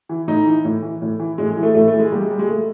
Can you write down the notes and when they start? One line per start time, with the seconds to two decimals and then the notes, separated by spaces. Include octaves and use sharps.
0.09 E3
0.28 A2 D#4
0.46 E3
0.65 A2
0.82 E3
1.02 A2
1.20 E3
1.38 A2 G#3
1.50 G#3
1.57 E3
1.63 A3
1.75 A2 A3
1.88 A3
1.93 E3
1.99 G#3
2.12 A#2 G3
2.22 G#3
2.31 G3
2.39 G#3
2.49 A#2 A3